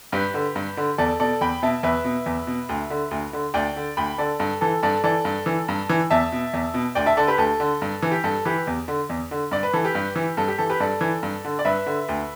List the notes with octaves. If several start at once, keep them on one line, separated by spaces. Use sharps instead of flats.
G2 G4 B4
D3
G2
D3
E2 A4 D5
B2 A4 D5
E2 G5 B5
B2 E5 A5
E2 B4 E5
B2
E2
B2
D2
D3
D2
D3
D2 D5 G5
D3
D2 G5 B5
D3 A4 D5
G2 A4
E3 A4
G2 A4 D5
E3 A4 D5
G2
E3
G2
E3
E2 E5 A5
B2
E2
B2
D2 D5 G5
E5 A5
D3 A4 D5
G4 B4
D2 A4
D3
G2
E3
G4
G2 A4
E3 G4 B4
E2
D3
E2
D3
G2 D5
B4
E3 A4
G4 B4
G2
E3
G2 A4
G4
E3 A4
G4 B4
G2 A4 D5
E3
G2
D3
D5
G2 B4 E5
D3
D2